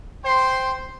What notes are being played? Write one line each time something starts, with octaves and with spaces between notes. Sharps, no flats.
C5 G5 C6